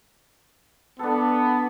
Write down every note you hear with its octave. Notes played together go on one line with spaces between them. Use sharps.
B3 D4 A4